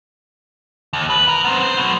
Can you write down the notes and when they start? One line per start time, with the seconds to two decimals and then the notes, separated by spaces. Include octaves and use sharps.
0.93 D#2
1.10 B4
1.28 A#4
1.45 B3 C4
1.63 C4 C5
1.77 F#3 B3